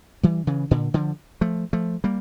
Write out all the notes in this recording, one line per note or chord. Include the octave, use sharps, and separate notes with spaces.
E3 G3
C#3 E3
A#2 D3
D3 F3
F3 A3
F3 A3
G3 A#3